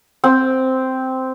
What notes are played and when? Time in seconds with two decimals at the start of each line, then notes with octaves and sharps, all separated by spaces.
0.24 C4